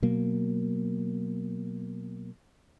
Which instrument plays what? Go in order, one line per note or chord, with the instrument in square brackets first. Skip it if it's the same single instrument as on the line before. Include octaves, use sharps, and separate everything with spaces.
[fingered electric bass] B2 F#3 A#3